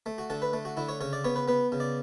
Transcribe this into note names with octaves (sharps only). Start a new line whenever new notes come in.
A3
F#4
D3 A4
B4
A3
F#4
D3 E4
C#5
C#3 C#5
D5
B3 C#5
B4
B3 B4
C#3
D5